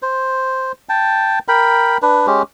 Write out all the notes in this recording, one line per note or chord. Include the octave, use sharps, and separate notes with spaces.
C5
G5 A5
A#4 G5 B5
D4 B4
G#3 C#4 G4